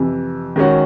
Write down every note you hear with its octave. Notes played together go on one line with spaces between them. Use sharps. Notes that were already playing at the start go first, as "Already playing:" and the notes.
Already playing: F2 C3 E3
D#3 G#3 C#4 F#4